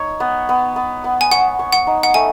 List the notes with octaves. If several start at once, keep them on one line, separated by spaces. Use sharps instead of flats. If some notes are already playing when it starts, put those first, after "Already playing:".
Already playing: D#4 C#5
B3
B3
B3
B3
G#5
C#5 F#5
C#5
F#5
D#4
F#5
A3 G#5